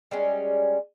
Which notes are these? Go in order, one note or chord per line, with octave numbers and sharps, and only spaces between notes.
G3 G#3 C#4